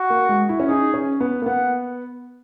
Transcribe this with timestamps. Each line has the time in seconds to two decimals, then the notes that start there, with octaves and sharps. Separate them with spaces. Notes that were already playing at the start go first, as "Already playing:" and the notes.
Already playing: F#4
0.10 A#3
0.29 G#3
0.49 E4
0.60 C#4
0.68 D#4 G#4
0.94 C#4
1.21 B3
1.42 A#3
1.46 B3 F#5